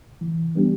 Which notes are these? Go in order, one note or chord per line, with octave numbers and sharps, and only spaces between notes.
E3
G3 B3 D4 G4